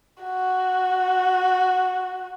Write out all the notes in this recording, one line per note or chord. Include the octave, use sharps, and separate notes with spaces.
F#4